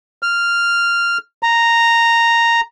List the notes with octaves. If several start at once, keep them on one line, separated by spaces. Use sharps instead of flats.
F6
A#5